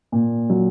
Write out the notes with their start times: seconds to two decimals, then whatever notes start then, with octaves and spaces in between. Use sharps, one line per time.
0.12 A#2
0.50 F#3